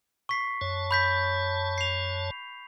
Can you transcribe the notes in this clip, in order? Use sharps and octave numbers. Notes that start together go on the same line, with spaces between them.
C#6 B6 C7
F#2 C#5 A5
B5 G6 B6
C7 F7